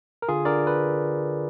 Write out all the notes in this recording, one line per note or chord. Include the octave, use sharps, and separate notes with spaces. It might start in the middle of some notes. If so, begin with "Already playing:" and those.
A#4
D3 F4 G#4
D3 A#4 D5
B4